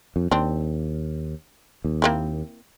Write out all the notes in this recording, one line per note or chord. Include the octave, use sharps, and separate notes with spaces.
F2
D#2 C4 D4
D#2
A#3 C4 E4